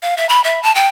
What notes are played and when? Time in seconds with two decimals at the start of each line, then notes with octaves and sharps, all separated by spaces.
0.02 F5
0.17 E5
0.29 B5
0.44 E5
0.63 A5
0.75 G5